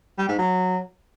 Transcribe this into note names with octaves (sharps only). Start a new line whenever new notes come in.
G3
G#2
F#3